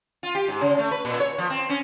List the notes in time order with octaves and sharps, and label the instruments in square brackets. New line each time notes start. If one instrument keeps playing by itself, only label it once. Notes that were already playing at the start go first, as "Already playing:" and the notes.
[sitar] F4
G4
G#2
C#3
A3
B4
A#2
C#5
F3
C4
C#4